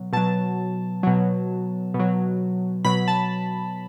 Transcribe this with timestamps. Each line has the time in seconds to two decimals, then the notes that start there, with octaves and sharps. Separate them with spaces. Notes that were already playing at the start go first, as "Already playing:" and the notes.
Already playing: B2 F#3
0.13 B2 F#3 A5
1.03 B2 F#3
1.94 B2
2.00 F#3
2.85 B2 F#3 B5
3.08 A5